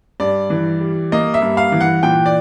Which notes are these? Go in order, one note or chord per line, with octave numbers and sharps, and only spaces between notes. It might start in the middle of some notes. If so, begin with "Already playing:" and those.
G2 D5
E3
G3
A#3 D#5
E5
G2
F5
E3
F#5
A#2 G5
D5